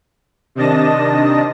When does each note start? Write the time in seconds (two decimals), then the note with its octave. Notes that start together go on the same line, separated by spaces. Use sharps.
0.55 C3 D#3 D4 D#5 A5 A#6